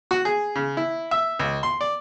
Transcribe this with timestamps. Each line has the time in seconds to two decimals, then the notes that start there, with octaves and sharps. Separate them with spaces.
0.11 F#4
0.25 G#4
0.56 C#3
0.77 E4
1.11 E5
1.39 C#2
1.63 C6
1.81 D5